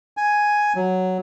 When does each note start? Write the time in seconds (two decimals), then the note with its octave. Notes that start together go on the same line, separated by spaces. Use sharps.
0.17 G#5
0.75 F#3